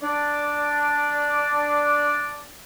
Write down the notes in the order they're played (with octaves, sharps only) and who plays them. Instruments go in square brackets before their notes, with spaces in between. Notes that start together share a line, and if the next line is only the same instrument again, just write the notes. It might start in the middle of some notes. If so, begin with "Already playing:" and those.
[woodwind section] D4 D5